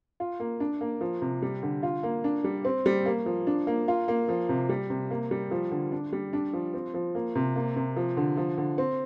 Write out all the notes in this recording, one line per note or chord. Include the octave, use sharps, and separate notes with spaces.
F4
A#3
D4
A#3
F3
C3
G3
D3
F4
A#3
D4
G3
C4
G3
A#3
F3
D4
A#3
F4
A#3
F3
C3
G3
C3
A#3
G3
F3
D3
D4
G3
D4
F3
C4
F3
A#3
C3
A#3
C3
F3
D3
F3
D3
C4